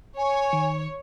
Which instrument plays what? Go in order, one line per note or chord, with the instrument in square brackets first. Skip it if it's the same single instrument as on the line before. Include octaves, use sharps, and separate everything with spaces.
[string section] C#5 [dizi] G#5
[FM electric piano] D#3